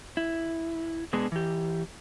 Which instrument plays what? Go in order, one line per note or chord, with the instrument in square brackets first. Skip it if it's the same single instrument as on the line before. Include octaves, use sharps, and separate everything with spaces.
[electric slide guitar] E4
B2 G#3 B3 D4 G#4
E3 G4